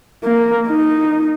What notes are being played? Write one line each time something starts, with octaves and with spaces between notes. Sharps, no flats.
A#3
D#4